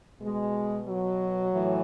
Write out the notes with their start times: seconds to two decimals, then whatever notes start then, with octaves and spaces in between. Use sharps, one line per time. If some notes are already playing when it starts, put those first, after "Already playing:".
0.20 B2 G#3
0.87 F#3
1.52 A2 E3